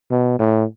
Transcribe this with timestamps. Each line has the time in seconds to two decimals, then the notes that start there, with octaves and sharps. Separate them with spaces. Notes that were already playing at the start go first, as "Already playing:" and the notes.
0.11 B2
0.39 A2